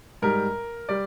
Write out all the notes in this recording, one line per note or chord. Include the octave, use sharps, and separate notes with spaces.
G#2 G3 A#4
G3 D5